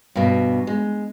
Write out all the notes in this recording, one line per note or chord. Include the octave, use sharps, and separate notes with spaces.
G2 B2
G#3